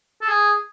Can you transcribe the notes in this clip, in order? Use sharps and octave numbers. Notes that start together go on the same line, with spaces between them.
A4
G#4